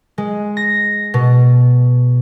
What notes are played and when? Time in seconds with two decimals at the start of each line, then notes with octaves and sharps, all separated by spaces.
0.18 G#3
0.57 A#6
1.14 B2